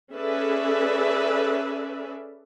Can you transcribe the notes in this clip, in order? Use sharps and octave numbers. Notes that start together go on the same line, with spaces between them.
C#4 G#4 A4 B4 D5 E5